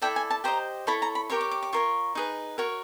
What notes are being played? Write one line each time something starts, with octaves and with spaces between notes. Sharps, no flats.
E4 A4 D5 G5
G#5
A5
G4 C5 D#5 A#5
E4 A4 C#5 B5
A#5
B5
G4 A#4 C#5 C#6
D6
D6
D6
F4 A#4 C#5 C#6
D#4 G#4 B4
F#4 A#4 C#5